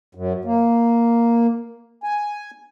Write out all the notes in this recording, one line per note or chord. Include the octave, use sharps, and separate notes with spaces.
F#2
A#3
G#5